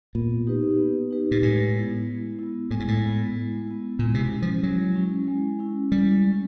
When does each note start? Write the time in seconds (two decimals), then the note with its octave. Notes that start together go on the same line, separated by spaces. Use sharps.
0.15 A#2 B3
0.47 D#4 G4 B4
0.78 B3
1.10 D#4 G4 B4
1.31 A#2
1.42 A2 G#3
1.74 B3 E4
2.07 G#3
2.39 B3 E4
2.71 A2 G#3
2.80 G#2
2.88 A2
3.03 B3 E4
3.35 G#3
3.68 B3 E4
3.99 A#2 G#3
4.14 C3
4.21 B2
4.31 C#4
4.36 E4
4.42 F3
4.63 F#3 G#3
4.96 C#4 E4
5.28 G#3
5.59 C#4 E4
5.92 G3 G#3
6.24 C#4 E4